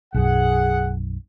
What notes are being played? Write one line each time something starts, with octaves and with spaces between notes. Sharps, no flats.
B1 F#2 G#4 F#5